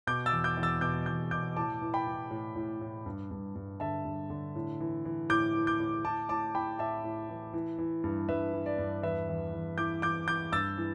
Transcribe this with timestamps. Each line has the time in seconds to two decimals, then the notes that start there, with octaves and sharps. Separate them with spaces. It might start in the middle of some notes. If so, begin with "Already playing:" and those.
0.07 B2 D6 G6
0.26 E6 A6
0.32 E2
0.44 D6 G6
0.57 E2
0.63 E6 A6
0.81 B2 D6 G6
1.06 E2 D6 G6
1.31 B2 D6 G6
1.56 A2 A5 D6
1.82 E3
1.94 G5 B5
2.07 E3
2.31 A2
2.56 A2
2.81 A2
3.06 G2
3.31 G2
3.55 G2
3.80 D3 E5 A5
4.05 G2
4.30 D3
4.55 A2
4.80 E3
5.05 E3
5.30 A2 D6 G6
5.55 E3
5.67 D6 G6
5.80 A2
6.05 A2 A5 D6
6.29 A2 A5 D6
6.55 A2 G5 B5
6.79 A2 E5 A5
7.04 A2
7.29 E3
7.54 E3
7.78 E3
8.04 G2
8.28 G2 B4 E5
8.53 E3
8.66 D5
8.78 G2
9.03 E2 B4 E5
9.28 E2
9.53 E2
9.78 E3 D6 G6
10.02 E3 D6 G6
10.27 E3 D6 G6
10.52 G2 E6 A6
10.78 E3